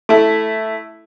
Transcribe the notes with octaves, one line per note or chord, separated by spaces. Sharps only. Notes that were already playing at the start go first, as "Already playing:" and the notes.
A3 E4